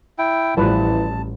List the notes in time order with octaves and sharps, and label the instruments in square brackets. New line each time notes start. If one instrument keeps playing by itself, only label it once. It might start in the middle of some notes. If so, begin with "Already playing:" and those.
[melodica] E4 G5
[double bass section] A1 [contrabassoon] E3 [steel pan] F3 G3 B4 [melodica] A5